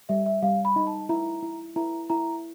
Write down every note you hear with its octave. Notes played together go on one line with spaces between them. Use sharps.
G3 E5
E5
G3 F5
B5
D#4
A5
E4 A#5
E4
E4 A#5
E4 A#5